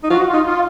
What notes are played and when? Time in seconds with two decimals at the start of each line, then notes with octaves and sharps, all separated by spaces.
0.04 D#4
0.10 F4 F#4
0.27 F4
0.33 D#4
0.45 F4